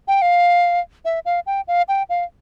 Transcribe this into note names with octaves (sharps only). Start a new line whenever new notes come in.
G5
F5
E5
F5
G5
F5
G5
F5